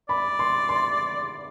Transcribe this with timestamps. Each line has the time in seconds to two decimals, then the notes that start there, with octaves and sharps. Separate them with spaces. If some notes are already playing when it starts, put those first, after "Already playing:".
0.09 D5 B5
0.39 C6
0.69 C6